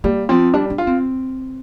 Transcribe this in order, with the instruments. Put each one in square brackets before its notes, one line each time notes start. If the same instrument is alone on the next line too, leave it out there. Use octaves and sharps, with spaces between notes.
[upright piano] G3 [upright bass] A#3
[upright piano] F3 [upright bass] C4
[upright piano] G3 [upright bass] D4
[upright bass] D4
[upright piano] F4
[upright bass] C4